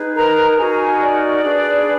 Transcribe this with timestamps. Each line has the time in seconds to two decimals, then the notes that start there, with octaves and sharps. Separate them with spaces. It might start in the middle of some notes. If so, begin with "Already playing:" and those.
Already playing: D#4 G#4 B4
0.15 A#4 A#5
0.51 A#5
0.58 D#4 F#4 G#4 A#4 G#5
1.01 D5
1.43 D4 G#4 B4